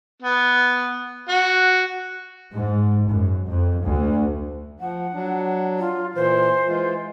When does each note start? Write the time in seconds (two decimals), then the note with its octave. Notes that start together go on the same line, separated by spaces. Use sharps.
0.22 B3
1.29 F#4
2.52 G#2
3.07 F#2
3.46 F2
3.83 D2
4.80 F3 F#5
5.14 F#3 D4
5.79 F4
6.15 A#2 E3 C5
6.67 E3 G#3 F4